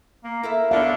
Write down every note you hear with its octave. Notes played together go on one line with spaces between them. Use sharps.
A#3
E4 A4 A#4 E5
A2 D3 B3 D4 F5